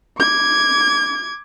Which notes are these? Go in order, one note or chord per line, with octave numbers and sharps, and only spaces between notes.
D6 G#6